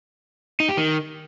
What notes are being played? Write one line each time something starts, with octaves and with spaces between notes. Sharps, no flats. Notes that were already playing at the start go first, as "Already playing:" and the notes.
D#4
G4
D#3